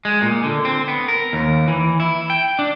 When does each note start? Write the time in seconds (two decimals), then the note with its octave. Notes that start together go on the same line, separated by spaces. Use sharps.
0.05 G#3
0.22 A#2
0.44 D3
0.65 C4
0.88 B3
1.08 A#4
1.33 D#2
1.68 E3
2.00 E4
2.30 G5
2.59 D4